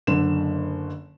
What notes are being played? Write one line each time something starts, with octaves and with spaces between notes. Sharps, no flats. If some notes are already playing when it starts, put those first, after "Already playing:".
F#1 D3 E7